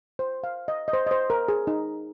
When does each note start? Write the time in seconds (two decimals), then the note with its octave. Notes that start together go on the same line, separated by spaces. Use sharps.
0.19 C5
0.44 F5
0.68 D#5
0.88 D#5
0.93 C5
1.07 D#5
1.11 C5
1.30 A#4
1.48 G#4
1.67 D#4